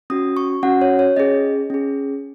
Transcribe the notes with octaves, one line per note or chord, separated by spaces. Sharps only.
C#4 F#4 D#6
C#6
C#4 F#4 F#5
C#5
C#5
C#4 G#4 D#5
C#4 G#4